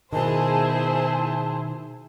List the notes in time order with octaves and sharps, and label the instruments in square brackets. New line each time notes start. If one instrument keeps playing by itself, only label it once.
[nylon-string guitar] B2 D#3 [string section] E4 G#4 C5 [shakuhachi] A5